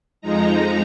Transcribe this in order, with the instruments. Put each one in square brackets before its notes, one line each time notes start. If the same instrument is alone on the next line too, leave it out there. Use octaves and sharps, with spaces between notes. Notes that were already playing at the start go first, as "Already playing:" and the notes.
[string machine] F2 F3 G#3 D#4 A#5